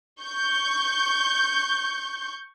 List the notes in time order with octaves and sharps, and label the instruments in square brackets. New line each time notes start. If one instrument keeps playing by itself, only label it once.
[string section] C#6 G6